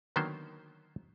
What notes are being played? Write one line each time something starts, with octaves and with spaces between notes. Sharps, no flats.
D3 D#3 F#3 A#3 B3 C5